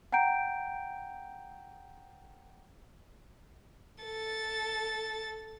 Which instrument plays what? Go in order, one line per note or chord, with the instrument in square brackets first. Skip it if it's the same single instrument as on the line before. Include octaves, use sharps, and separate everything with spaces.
[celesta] F#5 G5 A#5 G6 D7
[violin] A4 A6